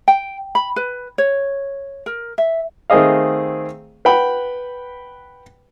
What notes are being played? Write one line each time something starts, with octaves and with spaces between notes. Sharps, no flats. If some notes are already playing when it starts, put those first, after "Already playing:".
G5
B5
B4
C#5
A#4
E5
D#3 A3 C4 G#4 D#5 F5
B4 F#5 G5 B5